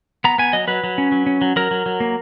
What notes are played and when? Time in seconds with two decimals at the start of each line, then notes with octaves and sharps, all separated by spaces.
0.24 B3 A#5
0.38 B3 G#5
0.53 F#3 D#5
0.68 F#3 B4
0.84 F#3
0.98 C#4
1.12 F#3
1.26 C#4
1.41 F#3
1.56 F#3 A#4
1.71 F#3
1.86 F#3
2.00 A#3